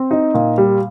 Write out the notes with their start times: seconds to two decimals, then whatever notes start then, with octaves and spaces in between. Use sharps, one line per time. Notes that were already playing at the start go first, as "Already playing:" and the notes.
Already playing: C4
0.11 D#4
0.34 A#2
0.58 G3